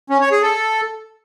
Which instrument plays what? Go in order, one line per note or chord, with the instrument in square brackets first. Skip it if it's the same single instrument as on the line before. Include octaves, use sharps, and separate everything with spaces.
[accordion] C#4
C#5
G#4
A4